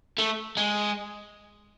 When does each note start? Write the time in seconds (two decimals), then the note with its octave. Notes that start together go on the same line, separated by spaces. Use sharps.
0.19 A3
0.57 G#3